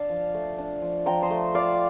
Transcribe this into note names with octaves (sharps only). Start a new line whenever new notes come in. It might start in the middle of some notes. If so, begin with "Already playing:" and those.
Already playing: D4 F5 A5
F3
A3
D4
F3
F3 G5 A#5
C5 D#5
A3
F4 D5 F5